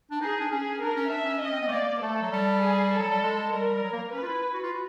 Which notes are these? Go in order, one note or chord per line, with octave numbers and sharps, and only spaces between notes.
D4
D#4 G#4
D4
C#4 G#4
D4 A#4
C#4
D4 E5
C#4
C#4 D#5
C4
B3
A3
A#3 D5
A#3
A#3
A3 A4
F#3
G3
G#4
A4
F#3
G3
G#3
G3 A#4
G3
F#3
A#3
C#4 B4
F4
E4
E4
F#4
F4
F#4